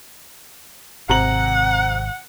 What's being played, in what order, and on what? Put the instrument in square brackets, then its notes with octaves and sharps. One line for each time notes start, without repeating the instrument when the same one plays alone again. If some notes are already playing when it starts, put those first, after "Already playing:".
[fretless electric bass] G#1 [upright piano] C3 A#5 F#7 [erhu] F#5